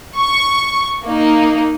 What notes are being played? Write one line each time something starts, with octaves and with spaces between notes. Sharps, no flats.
C#6
A#3 D#4